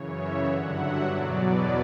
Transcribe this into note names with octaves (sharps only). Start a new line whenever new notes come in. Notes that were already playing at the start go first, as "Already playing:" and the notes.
Already playing: F#2 C#3 E3 C#5
E5
G2 D3 F#3 F#5
E5
E2 B2 F#3 D5
B4